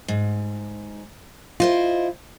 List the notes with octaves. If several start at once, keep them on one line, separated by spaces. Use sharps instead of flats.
G#2
E4 F4 C5 D#5